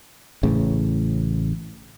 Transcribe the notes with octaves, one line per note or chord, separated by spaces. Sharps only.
A1 A2 C#3